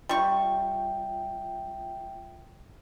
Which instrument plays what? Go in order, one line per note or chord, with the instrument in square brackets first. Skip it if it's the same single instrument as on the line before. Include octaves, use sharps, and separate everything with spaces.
[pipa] G3 C#6 [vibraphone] F4 E5 G5